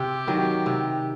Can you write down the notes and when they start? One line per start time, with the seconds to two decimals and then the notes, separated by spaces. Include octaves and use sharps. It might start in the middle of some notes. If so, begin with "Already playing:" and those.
Already playing: C3 G4
0.27 D#3 F#3
0.66 C3